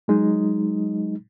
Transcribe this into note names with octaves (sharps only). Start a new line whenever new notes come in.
F#3 G#3 D#4